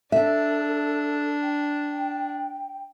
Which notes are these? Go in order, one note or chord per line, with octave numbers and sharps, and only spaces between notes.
D4 A4 E5
G5